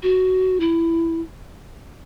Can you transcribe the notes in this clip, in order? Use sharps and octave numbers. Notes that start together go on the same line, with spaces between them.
F#4
E4